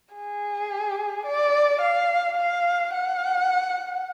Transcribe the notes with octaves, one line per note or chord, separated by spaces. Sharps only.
G#4
D5
F5
F5
F#5